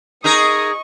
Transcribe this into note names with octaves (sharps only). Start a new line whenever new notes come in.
D#4 G#4 A#4 D#5 C#6 D#6